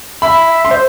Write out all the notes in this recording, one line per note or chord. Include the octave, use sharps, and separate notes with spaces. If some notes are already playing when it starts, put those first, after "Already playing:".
E5 B5
E5
C6
C5